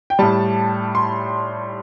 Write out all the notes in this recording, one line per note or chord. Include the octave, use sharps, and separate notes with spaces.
G5
A2 G3 A5
C6